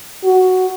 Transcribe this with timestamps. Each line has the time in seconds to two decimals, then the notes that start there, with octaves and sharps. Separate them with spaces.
0.24 F#4